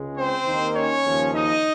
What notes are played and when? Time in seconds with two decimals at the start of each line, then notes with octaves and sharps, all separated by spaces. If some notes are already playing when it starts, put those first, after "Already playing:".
Already playing: C#2 C#3 G#3
0.16 C4 C5
0.46 D#2 D#3 A#3 D#4
0.75 C#4 C#5
1.04 D#2 C#3 F3
1.32 D#4 D#5